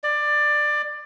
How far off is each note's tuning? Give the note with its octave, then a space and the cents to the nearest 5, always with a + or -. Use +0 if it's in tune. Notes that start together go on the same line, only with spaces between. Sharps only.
D5 +15